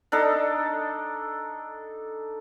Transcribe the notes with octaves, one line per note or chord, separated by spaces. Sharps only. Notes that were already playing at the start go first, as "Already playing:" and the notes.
D4 D#4 A4 A#5